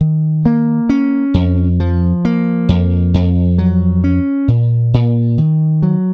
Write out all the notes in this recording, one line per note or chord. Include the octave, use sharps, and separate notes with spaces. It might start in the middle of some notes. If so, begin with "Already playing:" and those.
D#3
A#3
C#4
F2
F3
A#3
F2
F2
F#3
C#4
A#2
A#2
D#3
F#3